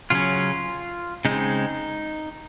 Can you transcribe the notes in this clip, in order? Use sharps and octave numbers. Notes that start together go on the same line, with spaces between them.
C#3 F#3 C#4 F4
C#3 G#3 C4 D#4